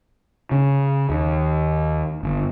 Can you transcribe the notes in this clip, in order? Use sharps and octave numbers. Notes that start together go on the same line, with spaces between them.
C#3
D#2
G1